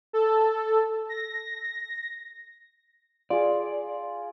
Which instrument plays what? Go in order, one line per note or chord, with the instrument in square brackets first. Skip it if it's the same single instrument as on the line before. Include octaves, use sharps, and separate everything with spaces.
[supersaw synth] A4
A#6
[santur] F4 G#4 [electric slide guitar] D5